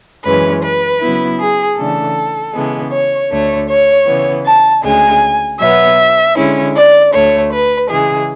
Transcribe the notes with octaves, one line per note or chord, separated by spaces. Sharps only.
F#2 E3 G#3 C#4 B4
B4
C#3 F#3 B3 E4
G#4
C#3 E3 A3 D4 A4
C#3 E3 G#3 B3
C#5
D2 D3 A3 C#5
C#5
C#3 E3 B3
A5
D2 C#3 G#3 G#5
B2 F#3 B3 E5
D3 G#3 C#4 E4
D5
D2 D3 A3 C#5
B4
C#3 E3 G#3 G#4